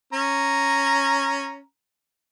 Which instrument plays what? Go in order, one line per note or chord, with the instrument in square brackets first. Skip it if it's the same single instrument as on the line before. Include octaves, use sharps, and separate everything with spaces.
[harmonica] C#4 A#5